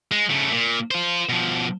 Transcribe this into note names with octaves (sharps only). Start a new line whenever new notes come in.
G#3
C#3 A3
A#2
F4 C5
B2 F3